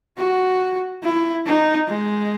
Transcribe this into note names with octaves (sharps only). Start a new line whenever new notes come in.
F#4
E4
D#4
G#3